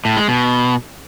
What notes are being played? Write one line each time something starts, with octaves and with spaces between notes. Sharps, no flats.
A2
G#3
B2